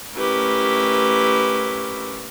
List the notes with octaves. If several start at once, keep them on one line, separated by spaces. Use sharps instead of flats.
A3 C#4 E4 G4 A#4 B4